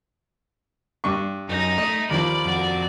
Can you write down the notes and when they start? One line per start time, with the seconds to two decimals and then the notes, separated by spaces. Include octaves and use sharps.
1.04 G2 C#6
1.49 F#2 D#4
1.78 A3 D#5
2.10 D#2 F3 D5 B5
2.45 F2 F#4